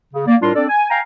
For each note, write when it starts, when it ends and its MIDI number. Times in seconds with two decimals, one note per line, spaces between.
0.14 0.24 49
0.26 0.35 58
0.26 0.35 74
0.41 0.50 45
0.41 0.50 55
0.41 0.50 62
0.41 0.50 65
0.41 0.50 70
0.41 0.50 84
0.54 0.64 60
0.54 0.64 62
0.54 0.64 69
0.54 0.64 74
0.68 0.86 80
0.89 0.99 77
0.89 0.99 79
0.89 0.99 80
0.89 0.99 82